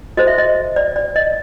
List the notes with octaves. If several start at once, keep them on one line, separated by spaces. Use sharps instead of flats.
F#4 A4 C5 D#5
E5
D#5
D5
D5
D#5